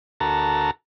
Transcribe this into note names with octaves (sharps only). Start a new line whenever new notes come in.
D2 F#4 A4 A#4 A5 A#5